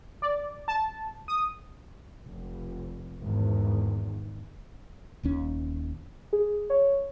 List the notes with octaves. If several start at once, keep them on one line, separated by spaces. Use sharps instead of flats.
D5
A5
D#6
F1
G#1 E2
D#1 D#2 C#4
G#4
C#5